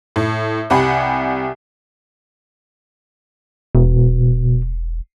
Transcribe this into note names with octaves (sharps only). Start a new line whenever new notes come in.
A2
C2 G4 F#5 G#5 B5
E1 B2